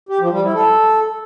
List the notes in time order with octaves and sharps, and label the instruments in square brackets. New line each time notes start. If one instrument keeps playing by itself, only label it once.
[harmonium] G4
F3
G3
E4
A4